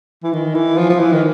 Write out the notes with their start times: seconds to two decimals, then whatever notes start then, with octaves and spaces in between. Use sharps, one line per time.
0.23 E3
0.33 D#3
0.54 E3
0.78 F3
0.89 F3
1.00 E3
1.13 D#3